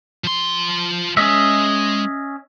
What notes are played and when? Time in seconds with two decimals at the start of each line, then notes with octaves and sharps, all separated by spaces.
0.24 F3 C6
1.17 G#3 C#4 D#5 E5